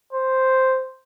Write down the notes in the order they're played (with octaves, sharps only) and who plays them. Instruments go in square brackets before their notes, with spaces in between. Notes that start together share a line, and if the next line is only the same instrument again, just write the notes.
[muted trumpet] C5